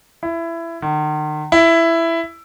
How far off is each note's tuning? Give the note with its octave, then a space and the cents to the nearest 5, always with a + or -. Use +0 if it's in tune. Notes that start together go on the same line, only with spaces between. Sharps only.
E4 +20
D#3 -40
E4 +10